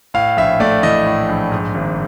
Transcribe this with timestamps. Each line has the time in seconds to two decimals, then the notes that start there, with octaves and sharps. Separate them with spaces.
0.14 A2 F5
0.37 A#1 E5
0.60 A3 D5
0.83 E3 D#5
1.06 A2
1.29 A#1
1.52 G#2
1.75 G#1